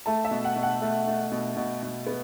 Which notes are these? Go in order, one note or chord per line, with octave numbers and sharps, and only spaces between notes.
A3 A5
E5
B2
F#5
B2
F#5
A3
A3
B2
B2
B2
B3